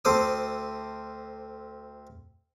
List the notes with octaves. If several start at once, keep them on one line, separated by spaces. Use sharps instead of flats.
D2 C4 A4 C5 D6 D#6